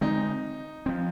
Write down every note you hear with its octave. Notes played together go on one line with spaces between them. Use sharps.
D3 G#3 C4 D#4
F3 C4